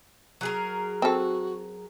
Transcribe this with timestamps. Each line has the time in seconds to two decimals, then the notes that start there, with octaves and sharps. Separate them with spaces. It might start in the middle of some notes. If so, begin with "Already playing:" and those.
0.41 F#3 G#4 A#4
1.02 C4 F#4 A4